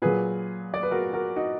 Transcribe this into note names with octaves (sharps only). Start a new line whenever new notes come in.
A#2 F#3 G#4 B4
D5
B4
F#4 A#4
F#4 A#4
D#4 F#4